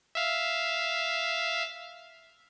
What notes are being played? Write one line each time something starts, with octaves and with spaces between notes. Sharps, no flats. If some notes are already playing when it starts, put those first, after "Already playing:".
E5 F5